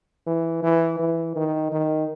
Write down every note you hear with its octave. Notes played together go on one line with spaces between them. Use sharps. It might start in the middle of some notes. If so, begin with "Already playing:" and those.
E3
E3
E3
D#3
D#3